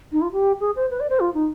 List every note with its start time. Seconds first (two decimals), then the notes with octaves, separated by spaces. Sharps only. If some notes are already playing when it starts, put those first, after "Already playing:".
0.12 D#4
0.21 F4
0.32 G4
0.60 G#4
0.76 C5
0.91 B4
1.00 D5
1.10 C5
1.20 F4
1.34 D#4